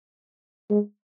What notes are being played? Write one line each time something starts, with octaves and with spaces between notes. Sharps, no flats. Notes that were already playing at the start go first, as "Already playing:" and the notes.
G#3